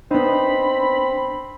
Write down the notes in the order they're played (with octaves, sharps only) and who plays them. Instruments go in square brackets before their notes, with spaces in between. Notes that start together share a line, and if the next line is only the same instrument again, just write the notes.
[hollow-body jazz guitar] B3 D#4 [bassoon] C4 [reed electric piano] D4 [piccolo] B5